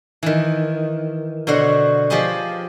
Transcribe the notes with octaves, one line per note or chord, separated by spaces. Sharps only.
D#3 E3
B2 D3 F#4 C5 C#5
F3 G4 G#4 C5 D#5 G#5